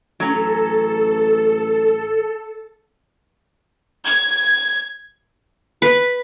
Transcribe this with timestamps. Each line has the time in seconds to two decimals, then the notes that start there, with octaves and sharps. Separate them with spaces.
0.20 A1 F#3 C#4 A4
4.05 G#6
5.82 B4